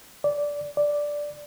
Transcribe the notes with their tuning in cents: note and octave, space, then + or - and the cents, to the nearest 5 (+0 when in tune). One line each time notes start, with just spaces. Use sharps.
D5 -15
D5 -5